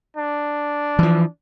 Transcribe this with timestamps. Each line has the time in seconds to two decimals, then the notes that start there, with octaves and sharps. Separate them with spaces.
0.16 D4
0.99 E3 F3